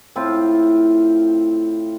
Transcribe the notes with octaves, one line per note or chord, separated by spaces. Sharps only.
A2 C4 E4 F4